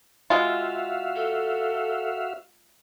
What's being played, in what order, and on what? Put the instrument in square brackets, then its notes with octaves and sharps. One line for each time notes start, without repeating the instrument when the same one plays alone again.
[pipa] G#3 F4 [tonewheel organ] F#4 E5 F5
[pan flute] A4